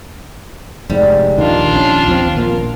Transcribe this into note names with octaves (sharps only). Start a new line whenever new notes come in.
F1 G#2 G3
A#1 D#2 D#3 D4 F4
A#1 C#4
D#2 F3 C4
A#1 A#2 A#3